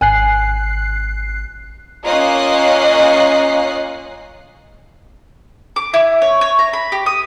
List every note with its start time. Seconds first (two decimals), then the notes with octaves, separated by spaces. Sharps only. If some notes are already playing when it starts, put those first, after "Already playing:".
0.01 G#1 G#5 F#6 C7
2.03 A#3 C#4 F4 D#5 F#6 C7
5.76 D6
5.94 E4
6.22 C#5
6.41 C#5
6.59 A#5
6.73 B5
6.92 G4
7.06 D#6